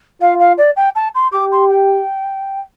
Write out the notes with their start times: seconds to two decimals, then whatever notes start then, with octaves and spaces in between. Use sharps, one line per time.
0.21 F4 F5
0.39 F5
0.57 D5
0.76 G5
0.95 A5
1.14 C6
1.32 G4 D6
1.51 C6
1.69 G5